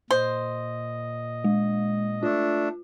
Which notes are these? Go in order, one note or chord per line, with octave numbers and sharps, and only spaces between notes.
A#2 C5 D#5
G#3
A3 D4 F4